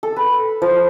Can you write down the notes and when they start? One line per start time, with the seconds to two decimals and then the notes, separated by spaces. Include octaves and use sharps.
0.03 A4
0.16 B4
0.62 F3